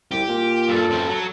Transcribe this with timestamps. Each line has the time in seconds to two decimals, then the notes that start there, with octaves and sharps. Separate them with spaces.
0.11 C2 G4
0.28 A#2
0.69 G2 A4
0.90 F#2 C4
1.09 F#3